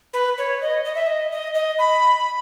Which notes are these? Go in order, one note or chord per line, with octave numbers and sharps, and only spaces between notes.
B4
C#5
D#5
D#5
E5
D#5
D#5
D#5
B5